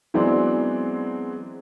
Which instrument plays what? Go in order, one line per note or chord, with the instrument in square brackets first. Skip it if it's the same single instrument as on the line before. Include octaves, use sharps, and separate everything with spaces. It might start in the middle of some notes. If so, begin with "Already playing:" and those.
[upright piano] E3 F#3 G#3 B3 C4 D4